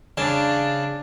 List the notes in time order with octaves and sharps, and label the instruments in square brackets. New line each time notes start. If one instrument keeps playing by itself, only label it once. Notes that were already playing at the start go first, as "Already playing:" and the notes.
[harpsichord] C#3 [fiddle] D4